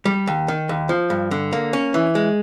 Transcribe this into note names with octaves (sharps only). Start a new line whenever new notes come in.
G3
D#2
D#3
D#2
F3
G2
D3
A#3
C#4
E3
G#3